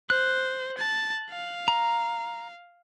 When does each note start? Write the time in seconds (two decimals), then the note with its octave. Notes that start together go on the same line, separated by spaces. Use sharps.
0.10 C5 F#6
0.78 A5
1.30 F5
1.68 A#5